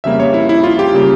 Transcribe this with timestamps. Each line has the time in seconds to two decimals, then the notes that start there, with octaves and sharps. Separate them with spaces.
0.04 F2 C#3 G3 A#3 E5
0.20 C#5
0.34 E4
0.49 E4
0.64 F4
0.79 G4
0.94 C#3 G3 A#3